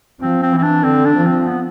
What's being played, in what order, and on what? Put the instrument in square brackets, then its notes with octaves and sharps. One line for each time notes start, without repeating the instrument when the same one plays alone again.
[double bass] F3 [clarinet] C4
[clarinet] C4
[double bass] E3
[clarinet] C4
D4
[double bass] D3 [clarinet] C4
[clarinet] D4
[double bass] F3
[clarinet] C4
B3